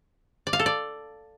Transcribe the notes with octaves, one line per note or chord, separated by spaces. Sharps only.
D5
F5
A4
D5